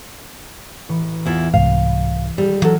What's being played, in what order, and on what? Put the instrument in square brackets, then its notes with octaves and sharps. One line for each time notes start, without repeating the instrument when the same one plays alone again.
[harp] A1 E3 C#6
[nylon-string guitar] E2 E4 F4
[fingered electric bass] C2 G#2 [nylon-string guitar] F5
[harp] D#1 G#3 E6 [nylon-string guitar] G3
[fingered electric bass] E3 [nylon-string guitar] F#3 A4 [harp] C#6 F6 F#6